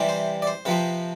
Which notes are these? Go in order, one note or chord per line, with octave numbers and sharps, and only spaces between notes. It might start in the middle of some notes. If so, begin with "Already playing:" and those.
Already playing: C3 E3 G3 C4
C5
D5
C5
C3 F3 C4 B4